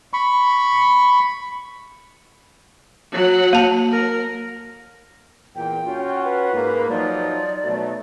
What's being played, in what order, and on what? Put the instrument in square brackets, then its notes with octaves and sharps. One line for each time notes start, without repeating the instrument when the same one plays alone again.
[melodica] B5 C#6
[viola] F#3 F#5
[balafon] A#3 A5
[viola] A#4
[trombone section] E2 A#2 [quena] G5
[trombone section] C#4 F4 F#4
[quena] B4
[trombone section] G#2 A#3
[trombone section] F3 F#3 D#4 [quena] D5
[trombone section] B2 F#3 A3